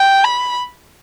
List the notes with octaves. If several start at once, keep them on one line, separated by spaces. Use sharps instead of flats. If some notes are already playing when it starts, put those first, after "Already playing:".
Already playing: G5
B5